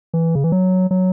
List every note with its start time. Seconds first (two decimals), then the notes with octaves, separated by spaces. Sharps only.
0.14 E3
0.35 C#3
0.44 E3
0.52 F#3
0.91 F#3